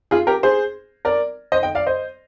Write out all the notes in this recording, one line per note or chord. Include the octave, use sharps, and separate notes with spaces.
F4 G#4
G4 A#4
G#4 C5
A#4 D5
C5 D#5
D#5 G5
D5 F5
C5 D#5